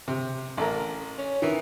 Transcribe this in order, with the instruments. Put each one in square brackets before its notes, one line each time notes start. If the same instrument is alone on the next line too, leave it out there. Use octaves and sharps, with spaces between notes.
[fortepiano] C3
A1 A4 A#4
[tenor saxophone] C#4
[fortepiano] D#3 [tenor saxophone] E3